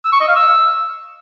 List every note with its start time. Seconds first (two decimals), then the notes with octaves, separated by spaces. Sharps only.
0.05 E6
0.13 C#6
0.20 D#5
0.28 F5
0.36 E6